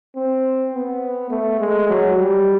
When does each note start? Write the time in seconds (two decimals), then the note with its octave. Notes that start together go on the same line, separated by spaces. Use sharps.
0.16 C4
0.74 B3
1.30 A3
1.60 G#3
1.89 F#3
2.18 G3